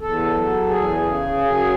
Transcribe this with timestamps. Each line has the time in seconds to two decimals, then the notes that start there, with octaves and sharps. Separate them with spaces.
0.01 E2 A4
0.34 F#3
0.68 E2 G#4
1.02 C#3
1.36 F#2